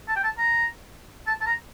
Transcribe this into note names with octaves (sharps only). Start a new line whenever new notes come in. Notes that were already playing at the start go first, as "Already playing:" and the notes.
A5
G5
A5
A#5
A5
A5
A#5